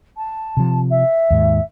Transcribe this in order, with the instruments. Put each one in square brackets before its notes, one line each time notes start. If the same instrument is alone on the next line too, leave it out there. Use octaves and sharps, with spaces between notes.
[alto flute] A5
[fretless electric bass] C3 F3
[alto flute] E5
[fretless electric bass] D#2 G#2